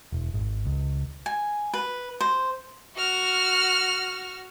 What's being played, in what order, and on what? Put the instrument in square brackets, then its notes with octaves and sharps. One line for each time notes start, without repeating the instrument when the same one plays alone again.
[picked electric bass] E1
G#1
C#2
[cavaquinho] G#5
B4
C5
[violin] F#4 F6